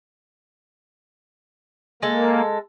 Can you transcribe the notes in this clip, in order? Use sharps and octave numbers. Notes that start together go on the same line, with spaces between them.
G#3 A#3 A4